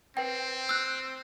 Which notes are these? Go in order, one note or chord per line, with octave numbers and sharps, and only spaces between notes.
C4 B4 G5
E6 F#6